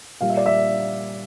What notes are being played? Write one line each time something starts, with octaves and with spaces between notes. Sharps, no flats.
A#2 G3 F5
E5
D5
E5